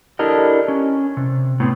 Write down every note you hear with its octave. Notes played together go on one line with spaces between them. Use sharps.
D4 E4 G4 A4 A#4 D#5
C#4
C3
A2 B3 C4